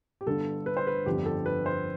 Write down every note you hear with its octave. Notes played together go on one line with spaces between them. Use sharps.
G4
G1 G2 D3 A4
B4
C5
B4
G1 F2 D3 G4
A4
B4
C5